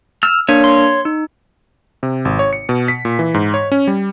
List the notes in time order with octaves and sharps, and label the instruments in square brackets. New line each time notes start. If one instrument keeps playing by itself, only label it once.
[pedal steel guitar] E6 F6
[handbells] A#3 D4 A#4 [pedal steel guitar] C#5
[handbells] C6
D#4
[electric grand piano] C3
G#1
C#5
C#7
B2
B6
A#2
E3
G#2
C#5
C#4
G3